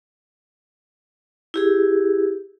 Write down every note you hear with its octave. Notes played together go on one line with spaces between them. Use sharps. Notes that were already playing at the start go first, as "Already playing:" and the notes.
E4 G4 G#4